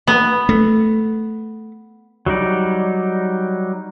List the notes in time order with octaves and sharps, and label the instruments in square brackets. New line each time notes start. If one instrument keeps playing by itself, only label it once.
[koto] B3
[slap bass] A3
[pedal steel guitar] F#3 G3 D#4 D5